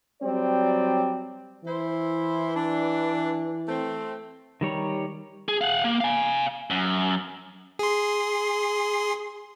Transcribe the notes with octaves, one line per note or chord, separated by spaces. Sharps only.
F#3 G3 C4 D5
E3 E4 C5
D4
A3 C4
D#3 G3 C#5 A#5
G#4
F5 F#5
A#3
F5 G#5
F#2
G#4 C6